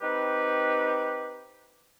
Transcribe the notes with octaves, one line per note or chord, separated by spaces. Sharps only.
C4 D#4 G4 B4